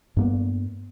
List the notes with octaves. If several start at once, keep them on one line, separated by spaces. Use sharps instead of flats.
G2 A#3 B3